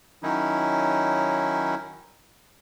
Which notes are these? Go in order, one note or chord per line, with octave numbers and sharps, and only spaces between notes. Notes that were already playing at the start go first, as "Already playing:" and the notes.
D#3 F#3 C#4 D#4 E4